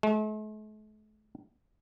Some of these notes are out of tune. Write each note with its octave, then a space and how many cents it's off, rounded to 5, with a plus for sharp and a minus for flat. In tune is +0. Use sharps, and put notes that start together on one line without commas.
A3 -45